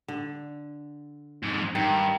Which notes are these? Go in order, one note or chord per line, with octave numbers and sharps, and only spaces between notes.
D3
F2 G#2
G2 D#3